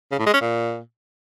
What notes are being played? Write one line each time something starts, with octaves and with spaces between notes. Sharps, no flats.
C#3
A2
G#3
C#4
A#2